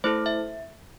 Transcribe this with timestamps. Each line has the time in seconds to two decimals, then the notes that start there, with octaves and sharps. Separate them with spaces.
0.04 A3 E4 A4 C5
0.26 E5